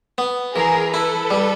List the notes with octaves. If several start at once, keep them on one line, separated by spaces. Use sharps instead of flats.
B3
E3 G#4 A#4
E4 A4 B4
G3